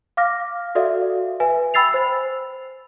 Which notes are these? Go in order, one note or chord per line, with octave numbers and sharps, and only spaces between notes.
F5 D6 F6 A#6
F#4 A4 D5 E5 F5
B4 E5 G#5
G5 B5 E6 A6 C7 F7
C5